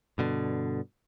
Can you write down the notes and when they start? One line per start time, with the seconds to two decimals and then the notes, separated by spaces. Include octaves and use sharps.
0.18 G2 B2 D3